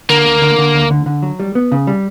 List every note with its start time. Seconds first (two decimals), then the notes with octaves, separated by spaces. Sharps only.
0.09 D3 A#3
0.25 D2
0.41 D3
0.58 D3
0.74 D2
0.90 D3
1.06 D3
1.23 F#3
1.40 G3
1.55 B3
1.72 C#3
1.87 G3